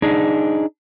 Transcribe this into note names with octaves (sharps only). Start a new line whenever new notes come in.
D4 D#4 G#4